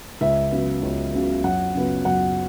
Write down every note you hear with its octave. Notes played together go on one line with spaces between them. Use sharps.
C#2 E5
C#3 F#3 B3
C#2
C#3 F#3 B3
F#2 F#5
C#3 F#3 B3
F#2 F#5